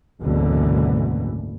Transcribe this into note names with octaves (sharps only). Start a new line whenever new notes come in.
F#1 D2 G#2 B2 D3 E3